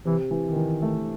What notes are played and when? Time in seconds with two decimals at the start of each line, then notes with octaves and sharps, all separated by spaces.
0.05 C3 E3
0.31 E3
0.43 D#3
0.56 E3
0.82 A3